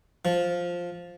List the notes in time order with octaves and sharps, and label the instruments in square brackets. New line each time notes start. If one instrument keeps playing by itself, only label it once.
[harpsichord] F3